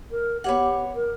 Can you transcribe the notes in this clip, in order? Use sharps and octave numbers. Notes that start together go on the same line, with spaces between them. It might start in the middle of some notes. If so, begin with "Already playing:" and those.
A#4
B3 G4 C#5 F#5
A#4